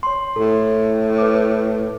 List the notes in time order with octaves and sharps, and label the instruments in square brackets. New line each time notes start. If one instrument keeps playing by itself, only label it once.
[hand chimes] C#5 C6
[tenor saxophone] A2 [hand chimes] A4
[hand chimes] B4 D6